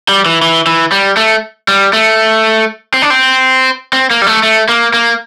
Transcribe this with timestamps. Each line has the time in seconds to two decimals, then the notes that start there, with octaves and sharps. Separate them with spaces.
0.09 G3
0.26 E3
0.42 E3
0.67 E3
0.92 G3
1.17 A3
1.68 G3
1.93 A3
2.94 C4
3.02 D4
3.10 C4
3.93 C4
4.11 A#3
4.22 G3
4.27 A3
4.43 A3
4.69 A#3
4.94 A#3